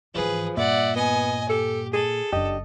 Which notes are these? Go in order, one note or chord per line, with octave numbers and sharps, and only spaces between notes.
G#2 E3 F3 G#4 B4
G2 A#2 D5 E5 F#5
B3 D#5 G#5
G4 A4
G#4 A4
F#1 F#2 D4 G4 D#5